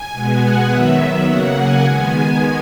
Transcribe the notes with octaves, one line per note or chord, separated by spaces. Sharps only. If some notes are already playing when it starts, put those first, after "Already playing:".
Already playing: G#5
B2 G#3 B3
F#5
D#3 F#3 B3 E5
C#3 F#3 A#3 F#5
G#5
D#3 G#3 B3